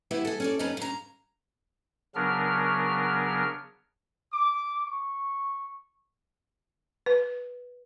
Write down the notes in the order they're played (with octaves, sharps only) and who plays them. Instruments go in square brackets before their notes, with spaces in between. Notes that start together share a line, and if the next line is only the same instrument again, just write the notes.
[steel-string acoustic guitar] E3 B3 E4 G4 B4 E5
G#4 A4
C#4 A4 D5
F#2 D#3 G3 C#4 B4
C#3 A#5
[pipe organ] C#3 F#3 B3 D4 A#4 F6
[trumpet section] D6
C#6
[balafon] B4